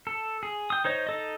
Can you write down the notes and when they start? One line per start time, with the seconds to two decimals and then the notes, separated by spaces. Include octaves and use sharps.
0.07 A4
0.43 G#4
0.70 G5 D#6
0.84 D#4 C5 C#5 D#5
1.07 D#4 A4 D#5